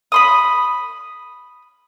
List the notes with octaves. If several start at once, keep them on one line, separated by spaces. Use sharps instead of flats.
B5 C6 D#6